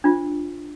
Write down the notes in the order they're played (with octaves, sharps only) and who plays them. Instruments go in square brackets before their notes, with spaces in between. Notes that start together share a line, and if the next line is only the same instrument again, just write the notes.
[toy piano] D4 F4 C5